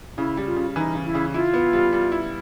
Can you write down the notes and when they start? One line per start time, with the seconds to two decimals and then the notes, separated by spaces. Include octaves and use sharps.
0.17 C#3 E4
0.37 G3
0.46 F4
0.56 C#3
0.76 E3 D#4
0.95 C#3
1.05 E4
1.15 C#3
1.34 E4 F4
1.54 B3
1.73 G3
1.93 G3
2.12 E4